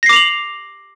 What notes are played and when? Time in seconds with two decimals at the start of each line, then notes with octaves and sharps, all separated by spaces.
0.03 A#6
0.06 C7
0.09 D6
0.13 F7
0.16 F#7